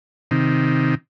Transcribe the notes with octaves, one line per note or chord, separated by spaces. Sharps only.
C3 D#3